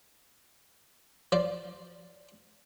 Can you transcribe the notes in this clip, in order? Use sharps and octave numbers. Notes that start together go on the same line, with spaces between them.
F3 D5